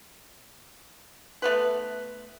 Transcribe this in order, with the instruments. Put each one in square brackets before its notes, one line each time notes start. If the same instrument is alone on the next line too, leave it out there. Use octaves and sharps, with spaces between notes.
[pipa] A3 B3 B4